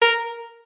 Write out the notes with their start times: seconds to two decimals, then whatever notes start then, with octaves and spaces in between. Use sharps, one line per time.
0.02 A#4